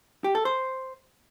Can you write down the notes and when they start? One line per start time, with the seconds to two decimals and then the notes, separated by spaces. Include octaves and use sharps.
0.24 G4
0.35 A4
0.45 C5